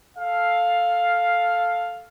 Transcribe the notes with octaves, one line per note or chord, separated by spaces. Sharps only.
A4 F5